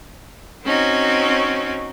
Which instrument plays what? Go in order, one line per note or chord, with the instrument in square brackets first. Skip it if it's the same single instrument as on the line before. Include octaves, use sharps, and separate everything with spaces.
[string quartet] C4 C#4 D#4 F#4